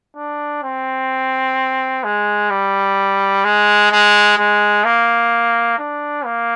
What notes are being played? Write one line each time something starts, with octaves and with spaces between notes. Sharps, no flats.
D4
C4
G#3
G3
G#3
G#3
G#3
A#3
D4
A#3